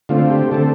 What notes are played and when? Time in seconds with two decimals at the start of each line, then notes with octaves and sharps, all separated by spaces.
0.09 D3 A3 C4 F4
0.30 G4
0.51 D3 A3 C4 A4